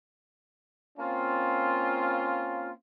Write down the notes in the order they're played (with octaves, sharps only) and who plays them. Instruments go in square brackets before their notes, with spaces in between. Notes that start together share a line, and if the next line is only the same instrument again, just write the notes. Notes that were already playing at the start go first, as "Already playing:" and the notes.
[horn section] A#3 C4 C#4 F4